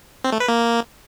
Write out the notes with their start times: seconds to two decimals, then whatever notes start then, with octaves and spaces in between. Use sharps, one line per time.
0.24 C4
0.32 A3
0.40 B4
0.48 A#3